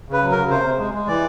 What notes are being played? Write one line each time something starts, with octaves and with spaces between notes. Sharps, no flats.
C#3 B4
F#3
A#4
C#3
C3 C5
C3
G#3
G#3
E3 D5